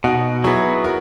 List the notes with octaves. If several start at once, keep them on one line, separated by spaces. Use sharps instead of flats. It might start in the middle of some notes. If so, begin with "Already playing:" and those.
B2 D#4 F#4
F#3 B3 E4 G#4
F#4 A#4